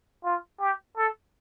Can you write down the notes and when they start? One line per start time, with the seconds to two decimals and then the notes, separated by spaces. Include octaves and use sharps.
0.25 F4
0.60 G4
0.97 A4